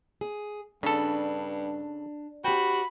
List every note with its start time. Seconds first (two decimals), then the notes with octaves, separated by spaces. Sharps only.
0.21 G#4
0.83 G2 C#3 D4 A4
2.44 C4 F#4 G4 G5 B5